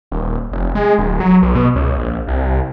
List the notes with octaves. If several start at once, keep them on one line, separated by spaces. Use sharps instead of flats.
D#1
F1
G#3
D1
F#3
B1
B2
C#2
A#1
C2